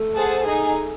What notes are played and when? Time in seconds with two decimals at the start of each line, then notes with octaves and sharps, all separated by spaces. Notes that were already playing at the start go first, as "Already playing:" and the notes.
Already playing: A3
0.14 G#4 C5 F#5 A5
0.44 D#4 G#4 D#5 G#5